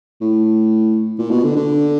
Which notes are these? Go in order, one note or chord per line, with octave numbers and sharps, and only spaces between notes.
A2
A#2
B2
D3
D3